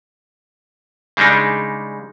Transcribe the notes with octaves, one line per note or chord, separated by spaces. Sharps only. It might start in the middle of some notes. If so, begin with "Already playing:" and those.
C#3 G3 G#3 D4 D#4